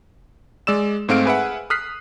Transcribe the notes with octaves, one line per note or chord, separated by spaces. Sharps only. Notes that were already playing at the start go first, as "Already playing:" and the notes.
G#3 D5 E6 E7
G#2 A3 C4 F5 F6 D7
G#4 B4 E5 F#5
D#6 F6 F#6 B6 C7